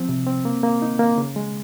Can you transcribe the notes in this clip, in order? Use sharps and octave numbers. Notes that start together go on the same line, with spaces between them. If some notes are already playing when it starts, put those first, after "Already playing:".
Already playing: F3 C4
C3
C4
A#3
A#3
D#4
A#3
C#3
G#3